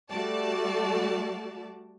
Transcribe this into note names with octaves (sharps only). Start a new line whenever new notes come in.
G3 A3 F#4 D5 A5